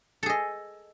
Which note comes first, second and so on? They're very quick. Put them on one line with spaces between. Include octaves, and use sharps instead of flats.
A4 G#4 D#5